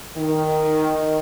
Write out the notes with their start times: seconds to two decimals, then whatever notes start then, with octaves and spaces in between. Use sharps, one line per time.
0.18 D#3